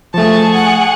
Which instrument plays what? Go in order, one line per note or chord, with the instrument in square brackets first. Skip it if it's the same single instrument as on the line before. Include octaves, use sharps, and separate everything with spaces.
[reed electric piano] F3 A3 [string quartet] G#4 C#6 [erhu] A5
[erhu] F#5